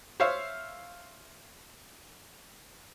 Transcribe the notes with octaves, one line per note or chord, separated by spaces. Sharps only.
C5 C#5 E5 F5